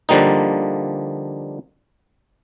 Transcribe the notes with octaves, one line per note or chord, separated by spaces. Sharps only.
D3 F3 G3 A#3 D#4